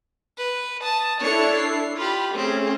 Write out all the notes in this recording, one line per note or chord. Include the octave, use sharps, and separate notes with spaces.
B4
A5 D#6
D4 E4 A4 C#5 C#7
C7
F4 G4 B5
A3 C4 C#4 G#4